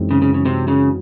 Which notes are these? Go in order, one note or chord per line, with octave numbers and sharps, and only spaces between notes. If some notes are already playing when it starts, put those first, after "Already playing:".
Already playing: F#2 E3 G#3 C4 D#4
C#3
C#3
C#3
C3
C#3